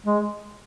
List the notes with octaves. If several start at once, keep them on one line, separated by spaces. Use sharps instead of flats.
G#3